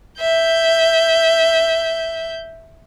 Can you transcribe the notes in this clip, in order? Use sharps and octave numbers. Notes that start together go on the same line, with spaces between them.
E5 G6